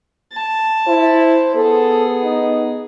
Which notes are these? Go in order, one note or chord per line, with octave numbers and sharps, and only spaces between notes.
A5
E4 C5
B3 G#4 A4
D#4